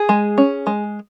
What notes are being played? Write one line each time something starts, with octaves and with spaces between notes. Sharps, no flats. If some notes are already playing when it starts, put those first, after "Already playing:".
Already playing: G#4
G#3
C#4
G#3